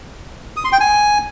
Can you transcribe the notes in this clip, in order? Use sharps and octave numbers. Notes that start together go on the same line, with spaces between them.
D#6
C6
G5
G#5